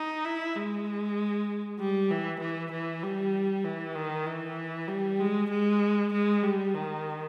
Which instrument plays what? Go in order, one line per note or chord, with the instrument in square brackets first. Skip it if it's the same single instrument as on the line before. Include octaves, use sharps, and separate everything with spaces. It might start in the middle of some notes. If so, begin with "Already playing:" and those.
Already playing: [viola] D#4
E4
G#3
G3
E3
E3
E3
G3
E3
D#3
E3
G3
G#3
G#3
G#3
G3
D#3